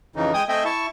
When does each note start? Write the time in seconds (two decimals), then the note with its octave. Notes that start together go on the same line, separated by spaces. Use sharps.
0.16 F2 C#3 E3 D#4
0.34 G#3 G5 G#5 D#6
0.49 A3 C4 D#5 E5 G5 G#5
0.65 E4 A5 C#6